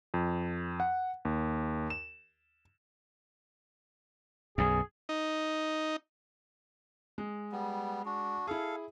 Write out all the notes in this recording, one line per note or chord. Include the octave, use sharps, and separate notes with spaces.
F2
F#5
D#2
E7
B1 F#2 G#4
D#4
G#3
G3 B3
D4 F#4
E4 G#4 A4 F5